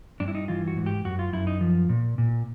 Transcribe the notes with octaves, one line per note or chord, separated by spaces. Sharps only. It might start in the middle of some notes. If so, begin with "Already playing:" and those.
G2 D4
E4
D#4
E3 F4
F#4
G#2
G4
F#2 F#4
F4
F#2 E4
D#4
F3
A#2
A#2